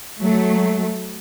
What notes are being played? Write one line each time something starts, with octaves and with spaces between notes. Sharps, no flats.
F#3 A3